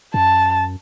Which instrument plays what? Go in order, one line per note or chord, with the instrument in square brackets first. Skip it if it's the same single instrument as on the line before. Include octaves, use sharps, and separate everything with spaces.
[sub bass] F#2 [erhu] A5